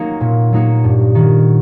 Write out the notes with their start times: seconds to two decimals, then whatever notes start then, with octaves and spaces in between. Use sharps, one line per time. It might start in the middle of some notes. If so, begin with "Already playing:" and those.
Already playing: F#3 A#3 D#4 F#4
0.21 A#2
0.52 F#3 A#3 D#4 F#4
0.84 G2
1.15 D#3 F#3